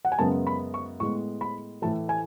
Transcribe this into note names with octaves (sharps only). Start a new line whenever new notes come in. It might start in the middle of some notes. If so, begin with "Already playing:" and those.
F#5
G#5
F#2 C#3 G#3 B3 A5
B5
C#6
A2 G#3 B3 C#6
B5
A2 E3 A3 A5
G#5